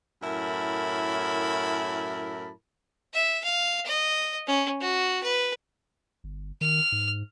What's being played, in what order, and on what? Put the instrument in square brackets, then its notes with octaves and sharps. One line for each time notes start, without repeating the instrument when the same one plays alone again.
[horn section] F#2 A2 E4 A#4 A5 B5
[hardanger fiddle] E5
F5
D#5
C#4
F#4
B4
[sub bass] G1
[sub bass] D#3 [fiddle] F6
[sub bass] G#2